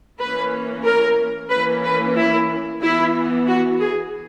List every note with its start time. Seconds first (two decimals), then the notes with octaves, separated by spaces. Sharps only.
0.20 E3 A#3 C#4 B4
0.85 A#4
1.50 E3 A#3 C#4 B4
1.84 B4
2.16 E4
2.82 E3 B3 E4
3.48 F#4
3.80 G#4